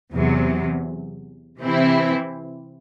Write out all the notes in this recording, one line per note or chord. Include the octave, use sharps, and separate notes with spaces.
E2 C3 F#3
C3 E3 C4 E4